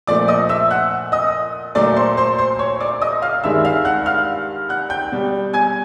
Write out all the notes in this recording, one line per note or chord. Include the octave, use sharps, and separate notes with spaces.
A#2 F3 A3 D5 D6
D#5 D#6
E5 E6
F#5 F#6
D#5 D#6
A#2 F#3 A3 D5 D6
C5 C6
C5 C6
C5 C6
C#5 C#6
D5 D6
D#5 D#6
F5 F6
G2 D#3 G#3 E5 E6
F5 F6
F#5 F#6
F5 F6
F#5 F#6
G5 G6
B2 G3
G#5 G#6